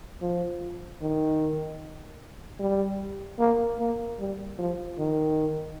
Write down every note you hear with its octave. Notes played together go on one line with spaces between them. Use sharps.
F3
D#3
G3
A#3
A#3
G3
F3
D#3